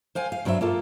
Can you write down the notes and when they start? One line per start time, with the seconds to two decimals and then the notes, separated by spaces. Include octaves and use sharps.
0.15 C5 F5 G5 G#5
0.32 F5
0.45 G2 F#3 C4 G4 E5
0.61 A#3 F4 A4